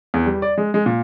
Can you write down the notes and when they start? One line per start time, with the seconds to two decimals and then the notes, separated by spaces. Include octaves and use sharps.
0.14 E2
0.26 G3
0.42 D5
0.58 G#3
0.74 G#3
0.86 A#2